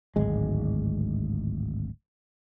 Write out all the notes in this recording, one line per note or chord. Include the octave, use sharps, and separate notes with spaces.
D1 G#1 G#3